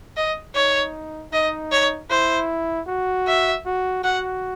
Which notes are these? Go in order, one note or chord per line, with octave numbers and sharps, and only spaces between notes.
D#5
D#4 C#5
D#4 D#5
C#5
E4 C5
F#4
E5
F#4
F#4 F#5